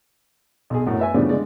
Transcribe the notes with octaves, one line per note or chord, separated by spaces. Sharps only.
B1 G#4
F#2 A2
B4 E5 G#5
A2 C#3 F3 G3 B3 D4
D3 G#3 D5